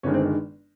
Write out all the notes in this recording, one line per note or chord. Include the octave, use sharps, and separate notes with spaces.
G1 G2 D#3 G#3 C#4
C4